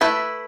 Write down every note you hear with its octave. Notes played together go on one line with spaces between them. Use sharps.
A3 E4 B4